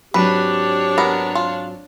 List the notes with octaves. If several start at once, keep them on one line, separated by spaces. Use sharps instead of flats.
G#2 F#3 C4 D4 G4 B4 C#5
B3 A#4
F4